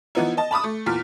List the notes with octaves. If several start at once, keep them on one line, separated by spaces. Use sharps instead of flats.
E3 F3 B3 D#4 E4
D#5 A5
A5 B5 D6 D#6
A3
E2 A#2 F6 B6